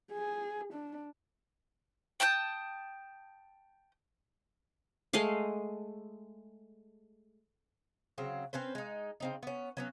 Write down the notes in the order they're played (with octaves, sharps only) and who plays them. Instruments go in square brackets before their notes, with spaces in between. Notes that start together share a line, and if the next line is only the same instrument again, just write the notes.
[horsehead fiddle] G#4
D4
[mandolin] G5 A5 D#6 G6
[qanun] G#3 A3 D#5 F5
[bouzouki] C#3 F#3 C4
C4 C#4 B4 C5
G#3 D#4
C#3 C4 D#4
B3 C#4
F#3 B3 C#4